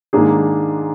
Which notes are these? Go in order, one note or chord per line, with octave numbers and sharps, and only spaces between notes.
G#2 D#3 A#3 D4 G#4